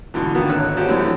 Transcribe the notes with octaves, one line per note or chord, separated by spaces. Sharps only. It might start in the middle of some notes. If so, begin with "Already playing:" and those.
G2 B2 D3 E3
D#3 A#3 B3 F#4
G#1 A4 C#5 F#6
A#3 C#4 D4 F#4 G4 C5
F#2 E3 A3 B3 C4 D4